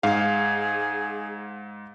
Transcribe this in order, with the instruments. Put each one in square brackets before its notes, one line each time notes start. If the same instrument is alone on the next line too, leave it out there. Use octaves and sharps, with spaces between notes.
[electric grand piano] G#2 F5 [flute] G#4